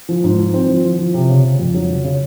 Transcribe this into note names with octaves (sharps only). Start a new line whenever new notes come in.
F3
G#2
F3
C4
F3
F3
F3
C3
C#3
C#3
F2
F#3
C#3
C#3